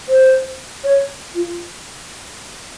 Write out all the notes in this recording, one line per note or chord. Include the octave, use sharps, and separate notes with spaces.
C5
C#5
F4